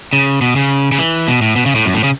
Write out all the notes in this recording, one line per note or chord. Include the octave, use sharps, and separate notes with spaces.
C#3
B2
C#3
C#3
E3
B2
A2
B2
C#3
A2
F#2
A2
C#3